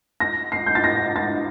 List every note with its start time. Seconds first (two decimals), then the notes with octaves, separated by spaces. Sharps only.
0.20 A#6
0.52 C7
0.66 G6
0.75 A6
0.84 A#6
1.16 A6